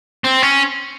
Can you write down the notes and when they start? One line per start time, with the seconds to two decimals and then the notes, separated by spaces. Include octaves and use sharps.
0.24 C4
0.42 C#4